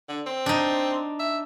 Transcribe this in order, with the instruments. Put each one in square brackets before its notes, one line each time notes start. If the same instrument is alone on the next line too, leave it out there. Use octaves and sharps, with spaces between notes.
[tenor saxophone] D3
C4
[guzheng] D4 D#4
[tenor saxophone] E5